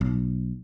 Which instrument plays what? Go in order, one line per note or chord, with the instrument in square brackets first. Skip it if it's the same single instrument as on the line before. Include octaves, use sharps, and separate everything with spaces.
[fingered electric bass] B1